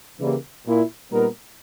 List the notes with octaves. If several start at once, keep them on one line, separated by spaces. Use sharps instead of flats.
C#3 E3 G3 A#3
A#2 A#3 E4
A#2 G3 B3 D#4 A#4